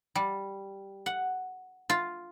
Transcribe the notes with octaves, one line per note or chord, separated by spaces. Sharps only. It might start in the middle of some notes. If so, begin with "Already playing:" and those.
G3
F#5
F4